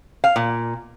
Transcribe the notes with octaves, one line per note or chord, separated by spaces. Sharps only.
F5
A#2